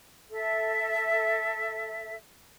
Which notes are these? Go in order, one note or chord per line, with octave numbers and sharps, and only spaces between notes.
A4 E5